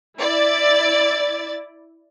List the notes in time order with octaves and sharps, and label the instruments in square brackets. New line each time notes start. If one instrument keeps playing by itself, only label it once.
[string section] E4 D5 A6